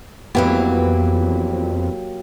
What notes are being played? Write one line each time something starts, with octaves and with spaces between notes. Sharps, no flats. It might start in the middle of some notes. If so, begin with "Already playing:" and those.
F2 E3 F#3 A#3 B3 G4